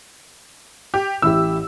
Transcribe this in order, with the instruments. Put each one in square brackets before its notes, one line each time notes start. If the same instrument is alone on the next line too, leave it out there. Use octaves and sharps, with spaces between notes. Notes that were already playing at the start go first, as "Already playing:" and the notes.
[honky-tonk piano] G4
[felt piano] A1 E4 G4 [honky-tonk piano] E6